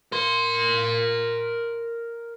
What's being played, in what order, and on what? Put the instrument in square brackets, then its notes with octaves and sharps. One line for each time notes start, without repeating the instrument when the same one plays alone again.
[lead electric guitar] A#4 C6